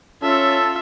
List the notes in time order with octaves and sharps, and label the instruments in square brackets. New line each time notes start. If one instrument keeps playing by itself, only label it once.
[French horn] C#4 [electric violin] F4 E5 [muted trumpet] A4